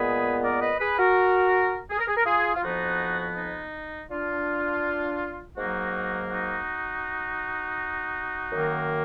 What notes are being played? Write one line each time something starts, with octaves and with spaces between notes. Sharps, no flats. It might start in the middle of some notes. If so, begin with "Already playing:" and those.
Already playing: A#2 G#3 B3 G#4 B4
A#4 D5
B4 D#5
G#4 B4
F#4 A#4
G#4
A#4
G#4
A#4
F4 G#4
F4
F2 F3 B3 D#4 F#4
D#4
D4 F4
G#2 F#3 A#3 D#4 F#4
D#4 F#4
F#2 D#3 A#3